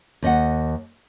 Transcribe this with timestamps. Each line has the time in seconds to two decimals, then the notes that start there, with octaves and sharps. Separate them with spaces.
0.22 D#2 D#5 F#5